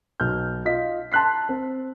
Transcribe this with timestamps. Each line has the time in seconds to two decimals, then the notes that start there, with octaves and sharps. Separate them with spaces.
0.20 B1 F6 G6
0.65 F4 D#5 B6
1.12 A5 C6 F#6 B6 C7
1.49 C4